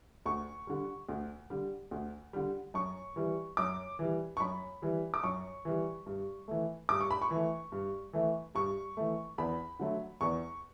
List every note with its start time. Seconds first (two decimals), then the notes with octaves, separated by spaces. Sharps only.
0.26 D2 C#6
0.67 D3 G3
1.09 D2
1.50 D3 G3
1.91 D2
2.33 D3 G3
2.74 F#2 C#6
3.16 E3 G3
3.57 F#2 D6
3.99 E3 G3
4.37 C#6
4.40 F#2 B5
4.82 E3 G3
5.14 D6
5.23 F#2 C#6
5.65 E3 G3
6.06 G2
6.48 E3 A3
6.89 G2 D6
7.01 C#6
7.11 B5
7.22 C#6
7.31 E3
7.36 A3
7.72 G2
8.13 E3 A3
8.55 G2 C#6
8.97 E3 A3
9.38 E2 B5
9.79 D3 F#3 A3
10.21 E2 C#6